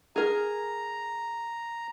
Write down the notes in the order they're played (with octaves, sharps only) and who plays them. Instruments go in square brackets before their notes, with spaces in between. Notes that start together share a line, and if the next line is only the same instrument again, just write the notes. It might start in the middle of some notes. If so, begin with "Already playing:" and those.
[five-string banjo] G#4 A#4 [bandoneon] A#5